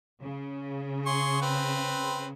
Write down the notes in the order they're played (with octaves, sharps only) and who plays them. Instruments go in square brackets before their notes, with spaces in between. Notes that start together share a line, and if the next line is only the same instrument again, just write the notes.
[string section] C#3
[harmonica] G#4 C6 C#6
C4 B4